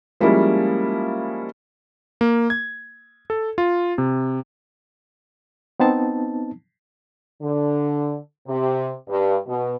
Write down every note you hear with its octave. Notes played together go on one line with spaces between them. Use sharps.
F3 G3 G#3 A#3 C#4 E4
A#3
G#6
A4
F4
C3
B3 C4 D#4 A5
D3
C3
G2
B2